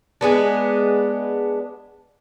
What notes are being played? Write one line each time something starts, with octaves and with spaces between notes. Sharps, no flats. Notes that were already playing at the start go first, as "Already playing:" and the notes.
G#3 B3 D4